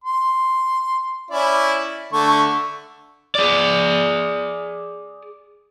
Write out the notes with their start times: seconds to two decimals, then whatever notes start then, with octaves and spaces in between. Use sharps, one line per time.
0.04 C6
1.31 C#4 E4 D5
2.13 D3 A3 C#6
3.35 G#4 D5